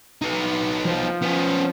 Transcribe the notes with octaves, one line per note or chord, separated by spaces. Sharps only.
B3 D#4
F3
B3 C#4